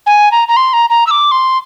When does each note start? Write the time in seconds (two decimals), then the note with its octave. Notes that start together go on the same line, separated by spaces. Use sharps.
0.06 G#5
0.32 A#5
0.48 A#5
0.57 C6
0.73 A#5
0.90 A#5
1.07 E6
1.11 D6
1.32 C6